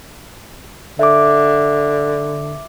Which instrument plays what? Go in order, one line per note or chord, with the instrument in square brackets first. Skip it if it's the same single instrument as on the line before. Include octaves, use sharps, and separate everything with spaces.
[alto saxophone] D3 [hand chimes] E5 D6